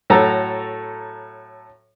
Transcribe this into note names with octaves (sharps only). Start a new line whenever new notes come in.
A2 F#3 A4 A#5